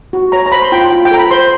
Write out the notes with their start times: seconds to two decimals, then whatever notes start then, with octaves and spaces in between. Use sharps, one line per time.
0.13 F#4
0.32 C#5 A#5
0.46 A#5
0.52 C5 B5
0.62 C6
0.72 F4 G5
0.82 G5
0.92 F4
1.05 G5
1.11 A4 A#5
1.19 B5
1.31 C5 C6